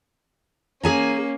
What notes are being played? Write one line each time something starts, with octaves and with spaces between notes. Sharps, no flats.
A#3 C#4 G#4 G#5 A#5